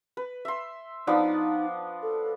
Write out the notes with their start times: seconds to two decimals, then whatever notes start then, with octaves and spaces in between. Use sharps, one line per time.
0.17 B4
0.45 E5 C6
1.07 F3 B3 D4 D#4
2.02 A4